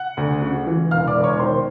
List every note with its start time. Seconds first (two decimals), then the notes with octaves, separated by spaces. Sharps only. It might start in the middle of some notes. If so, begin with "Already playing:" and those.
Already playing: F#5 F#6
0.17 D2
0.42 C#3
0.67 E3
0.91 E1 F5 F6
1.07 D5 D6
1.15 E1
1.24 C#5 C#6
1.39 D#3 C5 C6